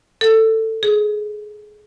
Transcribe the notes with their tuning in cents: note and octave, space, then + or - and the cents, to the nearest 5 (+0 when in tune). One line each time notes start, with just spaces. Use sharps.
A4 +15
G#4 +20